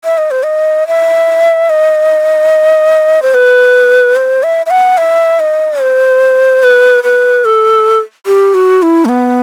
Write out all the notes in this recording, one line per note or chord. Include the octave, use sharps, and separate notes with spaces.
E5
D#5
C5
D#5
E5
D#5
C5
B4
C5
E5
E5
F#5
E5
D#5
C5
B4
B4
A4
G4
F#4
E4
A3
B3